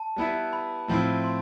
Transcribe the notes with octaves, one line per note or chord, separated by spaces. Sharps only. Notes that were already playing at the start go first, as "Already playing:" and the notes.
Already playing: A5
G3 B3 E4 B4 E5
B5
A2 F3 C4 E4
C6